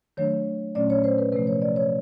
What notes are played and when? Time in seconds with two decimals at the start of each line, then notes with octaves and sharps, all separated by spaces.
0.17 D#3 F#3 A3 D4 C#5
0.75 A#2 F#3 A3 C#4 D5
0.90 C#5
1.04 C5
1.18 B4
1.32 C3 F3 A3 B4
1.47 C#5
1.62 D5
1.76 C#5